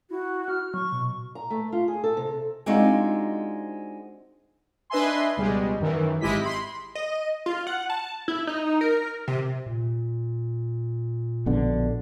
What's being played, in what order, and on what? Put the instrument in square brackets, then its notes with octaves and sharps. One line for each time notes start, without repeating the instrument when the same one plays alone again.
[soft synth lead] E4 [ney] F#4
[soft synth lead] F6
[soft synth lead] F#3 [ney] C#6
[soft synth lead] B2
[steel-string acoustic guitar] A#5
A3
F4
G#4
A4
C3
[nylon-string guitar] G#3 C4 D4 D#4 F4 F#4
[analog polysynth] D4 B4 D#5 E5 G#5 C6
C#2 B2 G3 G#3
F#2 D#3 E3
G#1 G#3 E4 G4 D#5 B6
B5 C6
[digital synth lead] D#5
F4
F#5
A5
E4
D#4
A#4
C3
[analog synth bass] A#2
[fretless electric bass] A#1 B2 D3